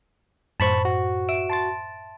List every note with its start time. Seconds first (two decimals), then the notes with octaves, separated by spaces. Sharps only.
0.60 F#2 A2 C5 A5 B5 C#6
0.85 F#4
1.29 E5 D7 E7
1.50 A5 C6 A6